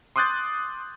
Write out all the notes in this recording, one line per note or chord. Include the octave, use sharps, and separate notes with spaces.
C6 D6 D#6 F#6 G6 A6